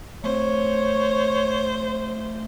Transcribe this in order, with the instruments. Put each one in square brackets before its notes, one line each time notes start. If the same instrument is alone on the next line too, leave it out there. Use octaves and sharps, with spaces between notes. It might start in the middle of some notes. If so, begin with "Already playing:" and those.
[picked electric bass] A3 A#3 C4 [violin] C5 [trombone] C#5